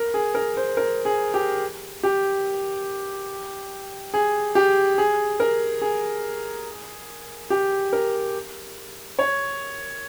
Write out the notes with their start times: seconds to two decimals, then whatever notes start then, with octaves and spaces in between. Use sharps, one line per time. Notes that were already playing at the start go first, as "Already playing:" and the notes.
Already playing: A#4
0.14 G#4
0.35 A#4
0.57 C5
0.77 A#4
1.05 G#4
1.34 G4
2.03 G4
4.14 G#4
4.55 G4
4.98 G#4
5.40 A#4
5.82 G#4
7.50 G4
7.93 A#4
9.19 C#5